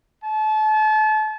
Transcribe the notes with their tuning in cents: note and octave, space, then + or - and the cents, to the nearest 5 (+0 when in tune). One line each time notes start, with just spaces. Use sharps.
A5 -35